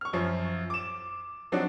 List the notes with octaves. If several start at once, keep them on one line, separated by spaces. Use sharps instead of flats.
C#6 F6
F#2 F3
D6 E7
F3 F#3 C4 D4 D#4 F#4